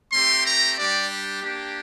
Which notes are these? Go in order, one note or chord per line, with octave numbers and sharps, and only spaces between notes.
A3 C4 G4 C6
A#5
G3 D4 G4 D5
A#3 D4 G4